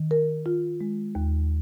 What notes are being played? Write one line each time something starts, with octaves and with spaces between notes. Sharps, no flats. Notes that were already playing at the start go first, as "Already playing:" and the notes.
Already playing: D#3
A#4
F4
G#3
D#2